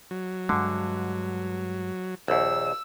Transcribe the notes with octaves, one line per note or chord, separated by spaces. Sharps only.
F#3
G2 D3 G#3
A#1 D#2 E6